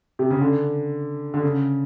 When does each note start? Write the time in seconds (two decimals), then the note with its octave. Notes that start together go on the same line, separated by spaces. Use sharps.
0.19 C3
0.30 C#3
0.41 D3
1.34 D3
1.43 C#3